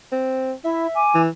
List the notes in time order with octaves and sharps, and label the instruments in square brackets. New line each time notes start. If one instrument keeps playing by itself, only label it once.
[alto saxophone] C4
[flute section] E4 [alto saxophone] E5
[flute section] G#5 D6
[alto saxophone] E3